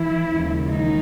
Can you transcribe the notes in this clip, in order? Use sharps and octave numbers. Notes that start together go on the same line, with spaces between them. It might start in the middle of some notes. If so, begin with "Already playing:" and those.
Already playing: E3 E4
D#2 C#3 F3 G#3
D#3 D#4